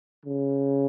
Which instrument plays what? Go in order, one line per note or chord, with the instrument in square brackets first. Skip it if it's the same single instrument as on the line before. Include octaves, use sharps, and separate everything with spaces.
[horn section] C#3